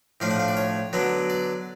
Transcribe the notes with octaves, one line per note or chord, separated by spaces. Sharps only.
A2 F3 A3 D4 F5
F#5
F5
D5
C#5
D3 F#3 B3 D4
D5